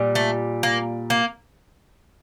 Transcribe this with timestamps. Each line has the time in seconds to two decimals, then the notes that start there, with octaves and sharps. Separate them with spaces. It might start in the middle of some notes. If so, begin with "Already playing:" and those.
Already playing: A#2 G3
0.15 A3
0.63 A#3
1.10 A#3